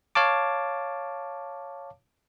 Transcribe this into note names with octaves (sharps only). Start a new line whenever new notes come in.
C#5 F5 A5 D6